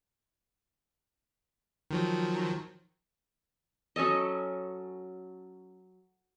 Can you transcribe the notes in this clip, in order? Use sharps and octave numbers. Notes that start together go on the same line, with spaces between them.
D#3 F3 F#3
F#3 C#4 A4 D#5